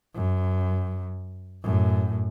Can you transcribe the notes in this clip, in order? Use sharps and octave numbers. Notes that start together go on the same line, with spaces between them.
F#2
F#2 A2